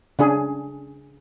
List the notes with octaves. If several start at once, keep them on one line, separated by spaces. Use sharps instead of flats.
C#3 D4 G#4